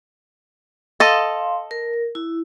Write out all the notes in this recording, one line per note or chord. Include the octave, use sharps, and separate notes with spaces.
A4 D#5 F5 C6
A#4
E4